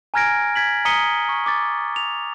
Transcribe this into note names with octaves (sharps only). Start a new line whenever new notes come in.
G#5 A#5 F6 G#6 A#6 D7
G#6 B6 F#7
A#5 D#6 B6 C#7 D#7 G7
C#6
D6 A6
F7